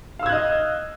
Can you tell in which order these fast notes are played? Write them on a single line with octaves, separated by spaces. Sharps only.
F5 E6 G#6 F#6 D#5